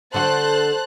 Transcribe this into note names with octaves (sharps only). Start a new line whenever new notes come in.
D3 F#4 C5 A5 F#6